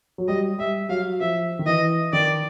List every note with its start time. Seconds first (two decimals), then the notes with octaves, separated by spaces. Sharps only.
0.18 F#3
0.28 G3 D#5
0.58 G3 E5
0.89 F#3 F5
1.21 F3 E5
1.59 D#3
1.66 E3 D#5
2.13 D#3 D5